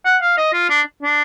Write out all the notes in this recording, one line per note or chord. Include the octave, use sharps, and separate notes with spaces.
F#5
F5
D#5
F4
D4
D4